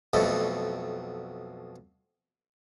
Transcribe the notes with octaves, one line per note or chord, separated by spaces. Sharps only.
B1 F2 B2 A3